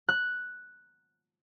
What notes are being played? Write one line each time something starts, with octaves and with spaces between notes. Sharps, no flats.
F#6